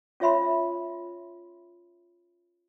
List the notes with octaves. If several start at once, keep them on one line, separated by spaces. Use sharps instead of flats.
C#4 F4 C#5 E5 B5 C6